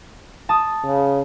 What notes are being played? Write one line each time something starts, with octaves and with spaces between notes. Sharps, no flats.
A5 D#6
C#3